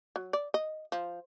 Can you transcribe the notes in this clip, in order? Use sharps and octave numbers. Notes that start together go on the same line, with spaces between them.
F#3
D5
D#5
F3